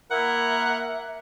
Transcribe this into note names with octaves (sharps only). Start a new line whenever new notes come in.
A#3 E4 A#4 E5 F#5